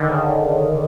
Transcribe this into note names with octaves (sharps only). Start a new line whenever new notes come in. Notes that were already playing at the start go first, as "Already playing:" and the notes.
Already playing: D3 D#3
C#3